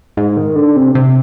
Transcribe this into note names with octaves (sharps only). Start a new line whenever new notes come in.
G#2
D#3
D3
C3
C3